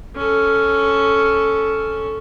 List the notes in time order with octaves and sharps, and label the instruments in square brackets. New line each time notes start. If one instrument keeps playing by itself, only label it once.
[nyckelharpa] C#4 A4